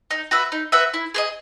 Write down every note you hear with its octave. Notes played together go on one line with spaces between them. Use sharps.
D#4
F#4 B4 E5
D#4
F#4 B4 E5
E4
G#4 C5 D#5